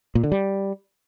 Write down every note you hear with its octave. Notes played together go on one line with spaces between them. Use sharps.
A#2
D3
G3